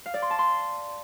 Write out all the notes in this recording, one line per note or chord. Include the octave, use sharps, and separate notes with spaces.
F5
D5
C6
A5
C6